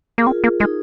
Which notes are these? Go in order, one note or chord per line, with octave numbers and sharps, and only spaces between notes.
A#3 G#4
C4 F4 A#4
A#3
G#3 D#4 G#4